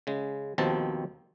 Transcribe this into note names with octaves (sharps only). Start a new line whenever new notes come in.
C#3 G#3
D#2 B2 D#3 F3 C4 A5